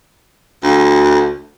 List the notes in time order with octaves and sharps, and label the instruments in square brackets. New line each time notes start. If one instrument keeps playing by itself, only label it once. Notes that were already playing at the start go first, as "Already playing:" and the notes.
[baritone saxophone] D2